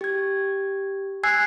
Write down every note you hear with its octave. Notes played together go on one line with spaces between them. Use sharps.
G4 G#6
G#5 E6 F#6 G#6 C7